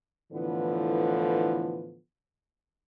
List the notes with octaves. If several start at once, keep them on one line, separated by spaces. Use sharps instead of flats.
A2 D3 E3 F3 B3